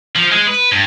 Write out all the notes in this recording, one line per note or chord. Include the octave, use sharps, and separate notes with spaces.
F3
G#3
B4
G2